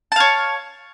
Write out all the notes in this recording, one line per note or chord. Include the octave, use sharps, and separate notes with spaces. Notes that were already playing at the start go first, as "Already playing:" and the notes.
C#5 F5 A5